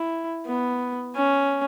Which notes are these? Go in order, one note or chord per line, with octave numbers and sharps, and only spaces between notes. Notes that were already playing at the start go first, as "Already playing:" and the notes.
Already playing: E4
B3
C#4